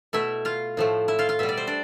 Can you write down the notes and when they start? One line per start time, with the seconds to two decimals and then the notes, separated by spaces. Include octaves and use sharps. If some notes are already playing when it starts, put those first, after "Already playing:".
0.13 B2 A3 E4 E5
0.45 F4 F5
0.77 A2 F3 A3
1.08 E4 E5
1.19 F4 F5
1.29 F4 F5
1.39 B2 G3 E5
1.49 D5
1.57 C5
1.67 D4 D5